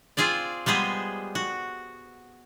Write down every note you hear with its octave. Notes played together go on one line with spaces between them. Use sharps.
C4 F4 G#4 C5 D5
G3 G#3 B3 G#4 C5
F#4